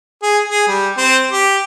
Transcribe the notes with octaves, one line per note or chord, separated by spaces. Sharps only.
G#4
G#4
G3
C4
G4